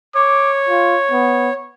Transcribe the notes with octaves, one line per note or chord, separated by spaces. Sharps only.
C#5 D6
F4
B3